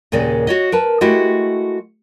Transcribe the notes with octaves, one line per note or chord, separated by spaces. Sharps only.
D#2 A#2 C#3 G#3 D5
F#4 C#5 D#5
A#4 B4 A5
G#3 A3 E4 F#4 G4